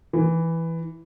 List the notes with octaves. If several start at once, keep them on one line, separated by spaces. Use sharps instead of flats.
E3